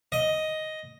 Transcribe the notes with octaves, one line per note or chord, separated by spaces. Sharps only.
D#5